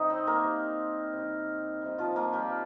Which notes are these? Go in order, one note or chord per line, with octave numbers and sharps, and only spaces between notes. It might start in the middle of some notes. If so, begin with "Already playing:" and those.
Already playing: C3 G3 D#4 D#5
C4 C5
A#3 A#4
C3 G3
C3 D#3 G3
C3 D#3 G3
F3 F4
A#3 A#4
G3 G4
F3